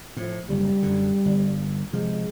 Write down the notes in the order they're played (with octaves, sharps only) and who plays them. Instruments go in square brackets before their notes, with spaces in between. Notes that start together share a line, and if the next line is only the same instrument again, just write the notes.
[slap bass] A2 [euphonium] F3
[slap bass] F#1 D2 [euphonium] G3
[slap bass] F#2 D3
G1
[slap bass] C3 F3 [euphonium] G#3